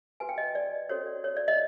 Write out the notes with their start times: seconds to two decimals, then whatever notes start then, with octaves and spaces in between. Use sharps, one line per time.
0.20 F#4 B4 G#5
0.29 G5
0.38 D#5
0.55 D5
0.89 C#4 F#4 A4 C5 C#5
1.07 D5
1.24 C#5
1.37 D5
1.48 D#5